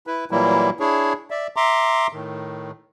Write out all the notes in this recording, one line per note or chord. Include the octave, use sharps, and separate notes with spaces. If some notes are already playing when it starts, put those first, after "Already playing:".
E4 B4
A#2 E3 F#3 G3 A#3 E4
D4 E4 G#4 C#5
D5 E5
E5 A#5 C6 D6
A2 D#3